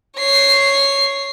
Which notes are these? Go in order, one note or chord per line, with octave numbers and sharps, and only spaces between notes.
C#5 C7